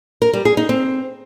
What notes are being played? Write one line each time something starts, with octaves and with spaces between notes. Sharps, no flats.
A#4
G3
G#4
D#4
C4